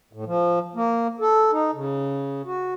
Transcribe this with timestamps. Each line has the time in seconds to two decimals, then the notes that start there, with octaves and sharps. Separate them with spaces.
0.13 A2
0.26 F3
0.75 A#3
1.20 A4
1.52 D#4
1.74 C#3
2.45 F#4